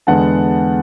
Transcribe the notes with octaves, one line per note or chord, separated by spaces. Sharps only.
E2 D3 G#3 B3 F#5 A5